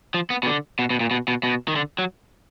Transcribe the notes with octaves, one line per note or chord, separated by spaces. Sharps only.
F3
B3
B2
D3
B2
B2
A#2
B2
B2
B2
D#3
D3
F#3